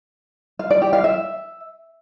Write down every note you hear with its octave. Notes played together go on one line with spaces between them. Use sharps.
F5
D5
G4
F5
E5